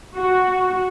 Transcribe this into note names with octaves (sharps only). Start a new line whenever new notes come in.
F#4